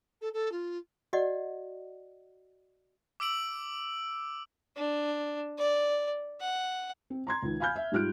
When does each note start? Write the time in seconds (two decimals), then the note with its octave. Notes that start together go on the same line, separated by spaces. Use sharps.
0.21 A4
0.33 A4
0.52 F4
1.13 F#4 D5 D#5 F#5
3.20 D6 E6 D7 F#7
4.76 D4
5.58 D5
6.41 F#5
7.10 C4
7.27 A#5 C6 G#6
7.42 C#2 D#3
7.60 F5 G#5 B5 F6 G6
7.76 E5
7.92 G#2 G3 F4 F6 F#6 D7